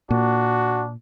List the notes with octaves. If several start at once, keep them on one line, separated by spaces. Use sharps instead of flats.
A#2 D4 F#4